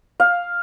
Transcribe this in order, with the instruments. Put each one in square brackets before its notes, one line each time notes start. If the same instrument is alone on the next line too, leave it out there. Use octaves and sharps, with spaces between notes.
[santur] F5